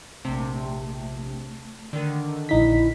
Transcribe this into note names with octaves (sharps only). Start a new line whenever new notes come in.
A#1 C3 A3
D3 D#3
A#1 D#4 E4 B6